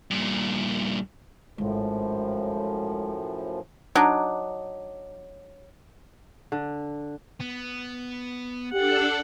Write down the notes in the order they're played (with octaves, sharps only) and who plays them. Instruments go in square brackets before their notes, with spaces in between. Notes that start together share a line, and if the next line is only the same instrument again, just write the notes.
[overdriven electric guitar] G2 A#2
[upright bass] G#1 G#3 [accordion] F#2 A2 F3
[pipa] F#3 D4 D#4
[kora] D3
[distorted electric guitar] B3
[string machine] D4 A4 [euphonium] G4 [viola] F#5